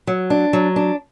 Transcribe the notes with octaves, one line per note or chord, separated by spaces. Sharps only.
F#3
D4
F#3
D4